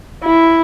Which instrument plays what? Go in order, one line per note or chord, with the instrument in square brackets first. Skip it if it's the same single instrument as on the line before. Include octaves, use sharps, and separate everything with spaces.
[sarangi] E4